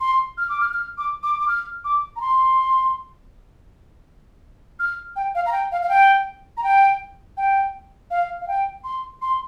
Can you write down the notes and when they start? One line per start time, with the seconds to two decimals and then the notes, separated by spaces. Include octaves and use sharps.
0.01 C6
0.38 F6
0.49 D6
0.61 F6
0.74 F6
0.98 D6
1.23 D6
1.40 D6
1.48 F6
1.85 D6
2.16 A#5
2.21 C6
4.80 F6
5.16 G5
5.35 F5
5.46 A#5
5.52 G5
5.72 F5
5.82 F5
5.89 G5
6.57 A#5
6.64 G5
7.37 G5
8.11 F5
8.41 F5
8.48 G5
8.84 C6
9.22 C6